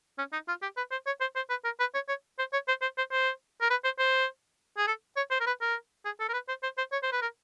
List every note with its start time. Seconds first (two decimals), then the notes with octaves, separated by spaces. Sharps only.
0.18 C#4
0.33 D#4
0.48 F4
0.62 G4
0.77 B4
0.91 C5
1.06 C#5
1.21 C5
1.36 C5
1.50 B4
1.65 A#4
1.80 B4
1.94 C#5
2.08 C#5
2.39 C5
2.53 C#5
2.68 C5
2.82 C5
2.97 C5
3.12 C5
3.61 A#4
3.70 B4
3.84 C5
3.99 C5
4.78 G#4
4.87 A4
5.17 C#5
5.31 C5
5.40 A#4
5.47 B4
5.61 A#4
6.05 G#4
6.20 A4
6.29 A#4
6.33 B4
6.48 C5
6.63 C5
6.78 C5
6.92 C#5
7.03 C5
7.12 B4
7.22 A#4